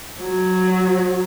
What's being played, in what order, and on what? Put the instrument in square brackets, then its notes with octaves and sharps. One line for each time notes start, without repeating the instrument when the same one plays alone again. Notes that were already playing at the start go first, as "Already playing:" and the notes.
[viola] F#3